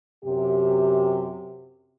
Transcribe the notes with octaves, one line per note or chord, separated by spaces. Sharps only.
F#2 C3 G4